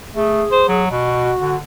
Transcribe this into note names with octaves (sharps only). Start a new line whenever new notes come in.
A3 G#4
C5
F#3
B2 F#4
D3